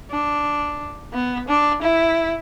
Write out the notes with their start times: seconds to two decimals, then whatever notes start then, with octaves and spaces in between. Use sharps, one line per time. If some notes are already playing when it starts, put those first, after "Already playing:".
0.11 D4
1.13 B3
1.48 D4
1.82 E4